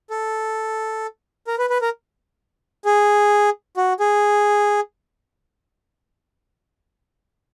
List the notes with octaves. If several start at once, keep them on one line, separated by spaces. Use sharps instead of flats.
A4
A#4
B4
B4
A#4
G#4
F#4
G#4